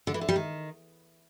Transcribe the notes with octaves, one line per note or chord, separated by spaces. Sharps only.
D3
E3
D3
G3
D#3